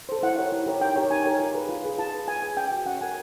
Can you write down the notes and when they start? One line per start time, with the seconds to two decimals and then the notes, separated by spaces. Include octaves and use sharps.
0.09 A4 C5
0.23 E4 F#5
0.38 G4 A#4 C#5
0.52 E4
0.66 G4 A#4 C#5
0.81 D#4 G5
0.96 G4 A#4 C#5
1.11 D#4 G#5
1.25 G4 A#4 C#5
1.40 F4
1.54 G#4 B4
1.69 F4
1.84 G#4 B4
1.99 F4 A5
2.14 G#4 B4
2.28 F4 G#5
2.42 G#4 B4
2.57 C#4 G5
2.72 F#4 A#4
2.86 C#4 F#5
3.01 F#4 A#4 G#5